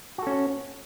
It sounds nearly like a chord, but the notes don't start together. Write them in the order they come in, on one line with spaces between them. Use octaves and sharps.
F#4 A4 C#4